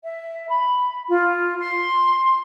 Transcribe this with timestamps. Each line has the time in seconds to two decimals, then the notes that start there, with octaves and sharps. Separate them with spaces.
0.04 E5
0.50 B5
1.09 F4
1.59 C6